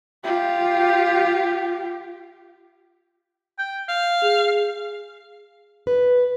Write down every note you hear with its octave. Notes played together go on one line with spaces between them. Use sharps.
F4 G4
G5
F5
G#4
B4